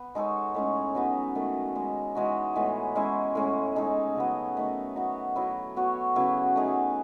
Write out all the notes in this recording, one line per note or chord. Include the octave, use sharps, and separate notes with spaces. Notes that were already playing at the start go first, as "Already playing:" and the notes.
Already playing: B3
G#3 D#4 A4 C#5
A2 G#3 C#4
F#3 B3 D#4
D#3 A3 D#4 A4
G#3 D#4 A4
E3 G#3 D#4 F#4
A2 E3 G#3 B3
G#3 C#4 E4
A2 G#3 C#4
G#3 D#4 A4
C#3 F#3 B3
D#3 A3 D#4
B3 D#4 F#4
F#3 B3 E4
B3 F#4 C#5
C#3 F#3 B3 E4
A3 D#4 G#4